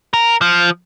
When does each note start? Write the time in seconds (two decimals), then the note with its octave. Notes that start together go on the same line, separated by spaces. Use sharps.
0.13 A#4
0.42 F3